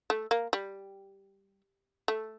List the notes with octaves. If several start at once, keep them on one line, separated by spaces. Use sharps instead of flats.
A3
A#3
G3
A3